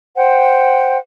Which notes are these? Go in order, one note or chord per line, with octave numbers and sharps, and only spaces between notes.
C5 F#5 G5